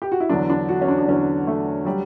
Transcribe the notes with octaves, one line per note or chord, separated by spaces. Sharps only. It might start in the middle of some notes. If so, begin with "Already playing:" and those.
G4
F#4
E4
E2 D3 F#3 D4
D4
F#4
C#4
D4
D4
E2 D3 F#3 C#4
A3
F#3 G3